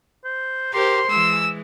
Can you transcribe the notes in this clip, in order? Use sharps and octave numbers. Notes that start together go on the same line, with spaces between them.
C5
G4 A#4 C5 C6
E3 G#3 E6